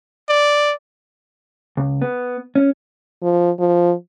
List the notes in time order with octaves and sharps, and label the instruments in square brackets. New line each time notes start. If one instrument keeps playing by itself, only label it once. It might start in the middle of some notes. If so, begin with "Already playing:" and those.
[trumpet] D5
[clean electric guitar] C#2
B3
C#4
[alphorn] F3
F3